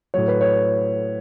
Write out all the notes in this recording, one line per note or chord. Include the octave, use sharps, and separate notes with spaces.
A2 F#3 C#5
B4
C#5